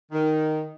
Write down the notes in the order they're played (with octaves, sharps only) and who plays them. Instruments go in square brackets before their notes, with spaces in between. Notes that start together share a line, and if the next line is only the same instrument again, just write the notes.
[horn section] D#3